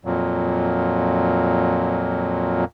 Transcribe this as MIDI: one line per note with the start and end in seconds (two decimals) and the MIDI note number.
0.05 2.65 41
0.05 2.65 46
0.05 2.65 54